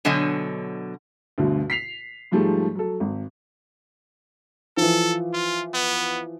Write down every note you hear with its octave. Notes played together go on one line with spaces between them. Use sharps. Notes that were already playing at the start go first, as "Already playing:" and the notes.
B2 D3 F#3 C#5 D#5 G#5
D2 G2 B2 D3
B6 C7 F7
G#2 F3 G3 A3 G#4
F#3 A4
G#1
E3 F3 A4
F4
B3